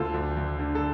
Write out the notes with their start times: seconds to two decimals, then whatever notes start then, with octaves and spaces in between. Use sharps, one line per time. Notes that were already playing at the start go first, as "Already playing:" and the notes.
Already playing: D2 F4 A4
0.14 D2
0.37 D2
0.59 D3
0.75 A4